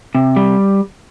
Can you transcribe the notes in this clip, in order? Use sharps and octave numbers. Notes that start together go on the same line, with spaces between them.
C3
G3